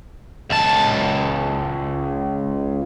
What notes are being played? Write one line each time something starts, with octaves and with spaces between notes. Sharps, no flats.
C#2 A5